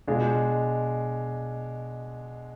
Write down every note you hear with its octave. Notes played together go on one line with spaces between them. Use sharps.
B2 G#3 D4 F4